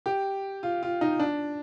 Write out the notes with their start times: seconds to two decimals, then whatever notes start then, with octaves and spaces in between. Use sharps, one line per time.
0.06 G4
0.63 F4
0.83 F4
1.01 D#4
1.19 D4